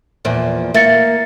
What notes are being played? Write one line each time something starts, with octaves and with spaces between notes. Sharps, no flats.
E2 A#2 F3
A#3 E5 A6 C#7